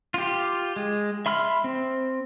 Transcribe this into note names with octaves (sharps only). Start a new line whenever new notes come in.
F4 G4
G#3
E5 B5 C6 F6
C4